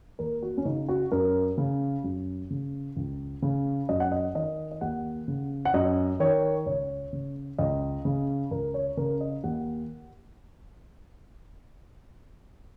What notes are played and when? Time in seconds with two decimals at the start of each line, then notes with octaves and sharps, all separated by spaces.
0.19 D#2 A#4
0.42 F#4
0.57 C#4
0.65 C#3 D#4
0.89 F#4
1.12 F#2 A#4
1.58 C#3
2.04 F#2
2.50 C#3
2.97 C#2
3.42 C#3
3.89 F#2 D#5
4.00 F#5
4.12 D#5
4.35 D#3 D#5
4.71 D#5
4.81 D#2 F#5
5.28 C#3
5.65 F#5
5.74 F#2 D#5
6.20 D#3 C#5
6.66 C#2 C#5
7.13 C#3
7.58 C#2 D#5
8.05 C#3
8.51 C#2 A#4
8.74 C#5
8.97 C#3 A#4
9.21 D#5
9.44 D#2 F#5